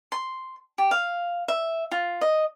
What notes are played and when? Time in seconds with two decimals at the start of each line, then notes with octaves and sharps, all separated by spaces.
0.12 C6
0.78 G4
0.91 F5
1.48 E5
1.92 F4
2.21 D#5